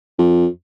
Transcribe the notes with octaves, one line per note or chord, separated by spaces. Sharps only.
F2